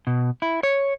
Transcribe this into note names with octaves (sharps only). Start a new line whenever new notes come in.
B2
E4
C#5